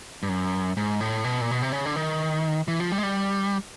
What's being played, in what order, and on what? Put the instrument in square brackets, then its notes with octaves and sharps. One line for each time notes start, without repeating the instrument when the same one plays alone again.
[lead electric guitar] G2
F#2
G#2
A2
B2
A#2
B2
C3
C#3
D3
D#3
E3
F3
G3
G#3
G3